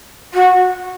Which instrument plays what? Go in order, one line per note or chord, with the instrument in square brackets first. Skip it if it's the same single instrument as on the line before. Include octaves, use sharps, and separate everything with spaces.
[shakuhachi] F#4